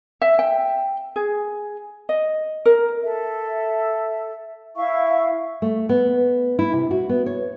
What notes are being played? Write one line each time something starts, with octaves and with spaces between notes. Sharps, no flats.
E5
G5
G#4
D#5
A#4
A4 E5
E4 E5 F5 C#6
A3
B3
E4
C3
F#4
B3
C#5